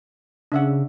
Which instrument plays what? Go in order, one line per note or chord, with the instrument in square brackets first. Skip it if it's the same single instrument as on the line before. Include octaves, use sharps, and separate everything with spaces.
[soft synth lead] C#3 [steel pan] D4 E5 F#5